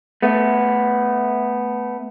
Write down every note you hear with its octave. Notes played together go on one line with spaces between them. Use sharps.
A3 B3